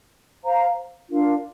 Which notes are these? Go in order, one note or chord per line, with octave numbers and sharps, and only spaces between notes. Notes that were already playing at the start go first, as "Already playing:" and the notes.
C5 F5 A#5
D4 F4 A#4 F5